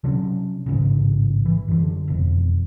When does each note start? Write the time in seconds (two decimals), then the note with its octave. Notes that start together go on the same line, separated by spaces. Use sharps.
0.04 C3 F#3 C#4 D4
0.66 A1 G#2 C#3
1.46 E3
1.68 F#2 D3
2.08 E1 F2